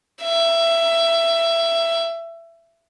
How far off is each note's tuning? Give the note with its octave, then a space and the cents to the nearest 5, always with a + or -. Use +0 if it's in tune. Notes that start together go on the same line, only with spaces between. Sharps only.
E5 +20